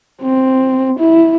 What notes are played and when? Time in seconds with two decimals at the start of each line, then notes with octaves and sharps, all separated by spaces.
0.23 C4
1.00 E4